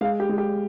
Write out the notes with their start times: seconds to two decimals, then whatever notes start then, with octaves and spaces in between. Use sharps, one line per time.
0.01 G#3 F5
0.20 G4
0.29 G#3
0.38 G4